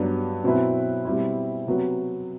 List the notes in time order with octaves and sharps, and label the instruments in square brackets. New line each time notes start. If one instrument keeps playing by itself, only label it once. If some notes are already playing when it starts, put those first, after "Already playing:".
Already playing: [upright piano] G2 F#3 B3 D4
B2 F#3 C4 E4 B4
B2 G3 C4 E4
C3 F#3 B3 F#4 B4